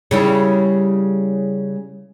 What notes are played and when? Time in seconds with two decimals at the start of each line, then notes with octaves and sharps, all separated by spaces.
0.11 C#3 G3 E4